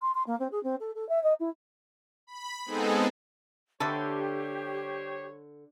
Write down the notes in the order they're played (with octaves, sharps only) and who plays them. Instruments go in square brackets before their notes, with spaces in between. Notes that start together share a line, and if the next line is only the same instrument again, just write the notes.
[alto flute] C6
C6
A#3
C4
G#4
C4
A4
A4
E5
D#5
E4
[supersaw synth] B5
G#3 B3 C4 D#4 G#4 A4
[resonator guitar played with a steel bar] D3 [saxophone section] G3 C5 C#5 [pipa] A3 B3 A4 [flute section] G4